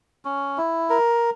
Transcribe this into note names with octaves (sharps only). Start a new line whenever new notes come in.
C#4
E4
A#4